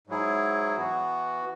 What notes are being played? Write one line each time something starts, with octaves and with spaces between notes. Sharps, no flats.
G#2 F#3 E4 G#4
E3 B3 F#4